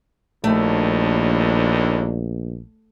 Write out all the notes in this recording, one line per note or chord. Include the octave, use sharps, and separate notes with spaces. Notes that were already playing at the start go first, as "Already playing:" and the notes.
A#1 D#2 A2 A3 D4